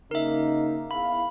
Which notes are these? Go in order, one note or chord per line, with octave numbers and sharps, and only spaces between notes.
C#3 A#3 D#4 A#4 E5
E2 E4 F5 B5